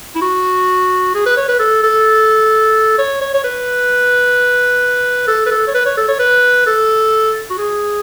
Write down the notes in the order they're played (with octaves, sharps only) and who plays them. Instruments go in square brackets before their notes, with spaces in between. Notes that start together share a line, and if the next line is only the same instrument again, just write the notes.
[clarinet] E4
F#4
G#4
B4
C#5
B4
A4
A4
C#5
C#5
C#5
B4
A4
B4
A4
C#5
B4
C#5
A4
C#5
B4
A4
F#4
G#4